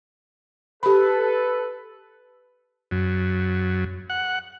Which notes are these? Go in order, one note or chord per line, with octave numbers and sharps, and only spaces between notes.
G4 A4 B4 B5
F#2
F#5